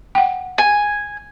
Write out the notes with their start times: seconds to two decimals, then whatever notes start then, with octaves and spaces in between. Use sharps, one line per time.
0.15 F#5 G5
0.58 G#5